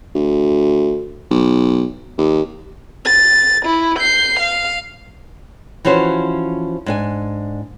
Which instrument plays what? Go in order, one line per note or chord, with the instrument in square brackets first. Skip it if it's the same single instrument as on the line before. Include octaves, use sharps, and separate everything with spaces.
[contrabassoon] D2
B1
D#2
[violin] A6
E4
G6 C7
F5
[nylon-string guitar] E3 F3 C#4 F#4 C5
G#2 D4 G#5